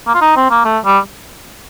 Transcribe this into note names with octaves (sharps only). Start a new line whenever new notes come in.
A#3
F4
D#4
C4
A#3
A3
G3